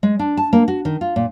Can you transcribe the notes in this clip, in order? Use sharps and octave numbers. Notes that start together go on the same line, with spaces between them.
G#3
D4
A5
A#3
F#4
D#3
F4
A#2